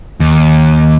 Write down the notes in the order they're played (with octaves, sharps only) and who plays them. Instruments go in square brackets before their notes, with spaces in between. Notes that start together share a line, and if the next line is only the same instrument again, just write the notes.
[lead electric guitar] D#2